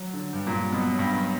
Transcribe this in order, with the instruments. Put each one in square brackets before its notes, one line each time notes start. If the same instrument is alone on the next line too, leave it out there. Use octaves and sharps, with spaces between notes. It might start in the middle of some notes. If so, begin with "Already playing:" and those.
Already playing: [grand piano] F#3
D3
G2
[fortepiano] A#2
[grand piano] G2
[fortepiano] B2 [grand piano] F#3
[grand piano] F#3
[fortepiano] G2
[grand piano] F#3